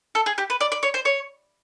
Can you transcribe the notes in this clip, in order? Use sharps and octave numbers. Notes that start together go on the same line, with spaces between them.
A4
G#4
G4
B4
D5
D5
C#5
C5
C#5